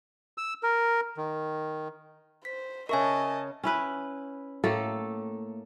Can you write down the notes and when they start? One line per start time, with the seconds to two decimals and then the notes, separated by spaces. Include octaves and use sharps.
0.38 E6
0.63 A#4
1.17 D#3
2.45 C5 B6
2.89 C#3 A#4 D#5 E5 G#5 A5 C#6
3.64 C#4 E4 B4
4.64 A2 A3 A#3 A4